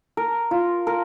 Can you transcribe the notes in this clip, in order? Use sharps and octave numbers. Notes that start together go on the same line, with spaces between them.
A#4
F4
A#4